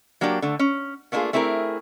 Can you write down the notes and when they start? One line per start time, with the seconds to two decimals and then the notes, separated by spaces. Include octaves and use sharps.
0.21 F#3 A#3 D4 G4 D5
0.42 D3 A3
0.59 C#4
1.12 A3 A#3 D4 D#4 F4 G#4
1.33 A3 C4 E4 G#4 A#4